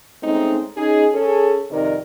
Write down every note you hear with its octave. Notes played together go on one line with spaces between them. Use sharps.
G#3 A3 C4 C#4 D#4
C#4 D#4 G#4
C#4 G#4 A4
F2 C3 D#3 D#4 A#4 D5